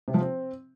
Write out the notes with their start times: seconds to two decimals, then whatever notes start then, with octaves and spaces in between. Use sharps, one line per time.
0.08 C3
0.14 F3
0.21 C4